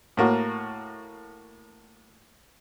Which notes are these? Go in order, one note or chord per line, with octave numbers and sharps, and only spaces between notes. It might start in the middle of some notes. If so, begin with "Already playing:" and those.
A2 A#3 F#4